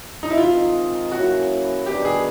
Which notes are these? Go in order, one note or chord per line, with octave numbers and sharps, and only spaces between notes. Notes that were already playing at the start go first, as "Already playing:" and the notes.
D#4
E4
D#3 G#3 C4 D#4 F4
F#3 A#3 C#4 E4 F#4 G#4
D#3 G3 B3 D4 F#4 G4
G#4